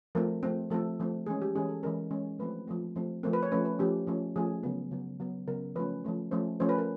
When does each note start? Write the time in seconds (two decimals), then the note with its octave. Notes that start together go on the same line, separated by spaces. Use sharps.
0.15 F3 A3 C4 A#4
0.43 F3 A3 C4
0.70 F3 A3 C4 A4
1.00 F3 A3 C4
1.26 E3 G#3 C#4 G#4
1.42 G4
1.55 E3 G#3 C#4 G#4
1.69 A4
1.83 E3 G#3 C#4 A#4
2.11 E3 G#3 C#4
2.39 F3 A3 C4 B4
2.67 F3 A3 C4
2.96 F3 A3 C4
3.23 F3 A3 C4 A#4
3.33 B4
3.43 C#5
3.52 F3 A3 C#4 B4
3.65 B4
3.79 F3 A3 C#4 G4
4.07 F3 A3 C#4
4.36 F3 A3 C#4 G#4
4.63 C#3 F#3 B3
4.91 C#3 F#3 B3
5.20 C#3 F#3 B3
5.47 C#3 F#3 B3 A#4
5.75 F3 A3 C#4 B4
6.04 F3 A3 C#4
6.31 F3 A3 C#4 C5
6.60 F3 A3 C#4 C5
6.69 B4
6.78 A#4